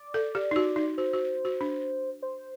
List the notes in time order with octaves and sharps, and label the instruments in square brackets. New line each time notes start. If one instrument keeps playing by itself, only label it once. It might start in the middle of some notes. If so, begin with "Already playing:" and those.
Already playing: [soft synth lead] D5
[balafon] A4
G4
D#4
F#4
D#4
[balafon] F#4 [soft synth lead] C5
[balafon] F#4
F#4
D4
[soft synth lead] C5